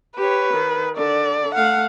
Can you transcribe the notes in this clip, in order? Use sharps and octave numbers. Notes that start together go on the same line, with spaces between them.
G4 B4 C#5
D#3
D3 D5
A3 F5 F#5